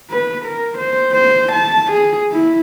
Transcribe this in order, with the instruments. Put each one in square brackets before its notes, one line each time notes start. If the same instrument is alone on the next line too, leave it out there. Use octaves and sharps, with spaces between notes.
[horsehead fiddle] B4
A#4
C5
C5
A5
G#4
E4